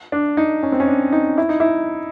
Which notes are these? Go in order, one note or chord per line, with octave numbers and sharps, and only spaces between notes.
D4
D#4
C#4
C4
C#4
D4
D#4
E4
D#4
E4